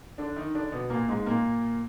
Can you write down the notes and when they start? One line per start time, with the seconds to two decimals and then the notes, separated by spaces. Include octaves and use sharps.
0.18 D3 D4
0.36 D#3 D#4
0.54 D3 D4
0.72 B2 B3
0.90 A#2 A#3
1.08 G#2 G#3
1.26 A#2 A#3